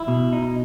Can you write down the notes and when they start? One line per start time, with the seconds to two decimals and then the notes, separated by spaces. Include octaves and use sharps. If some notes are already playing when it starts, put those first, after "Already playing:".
Already playing: E4
0.08 B2
0.33 D#4